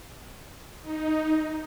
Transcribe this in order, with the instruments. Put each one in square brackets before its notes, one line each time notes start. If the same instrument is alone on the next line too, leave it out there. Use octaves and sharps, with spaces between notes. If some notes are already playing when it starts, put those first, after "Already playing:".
[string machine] D#4